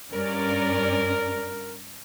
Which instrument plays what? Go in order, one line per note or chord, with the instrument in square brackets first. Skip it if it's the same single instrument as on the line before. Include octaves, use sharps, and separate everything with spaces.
[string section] G2 C#4 D5 [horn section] A#4